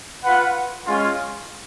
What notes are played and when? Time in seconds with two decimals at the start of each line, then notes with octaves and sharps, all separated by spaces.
0.23 F4 B4 F#5
0.85 G#3 C#4 F4